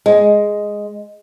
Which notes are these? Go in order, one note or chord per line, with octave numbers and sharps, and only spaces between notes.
G#3